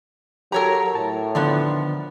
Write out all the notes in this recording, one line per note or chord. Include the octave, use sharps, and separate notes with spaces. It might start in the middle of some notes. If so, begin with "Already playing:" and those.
F#3 G4 A4 A#4 C#5 A#5
A2 A5
D3 D#3 F3 B3 D5 C6